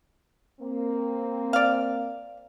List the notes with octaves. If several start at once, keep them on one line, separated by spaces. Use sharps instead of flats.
A#3 C4
D5 F5